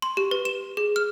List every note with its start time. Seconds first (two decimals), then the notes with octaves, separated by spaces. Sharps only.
0.02 C6
0.17 G4
0.31 B4
0.45 E7
0.77 G#4
0.96 F6